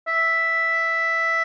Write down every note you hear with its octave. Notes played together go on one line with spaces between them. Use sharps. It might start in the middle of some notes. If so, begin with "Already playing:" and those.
E5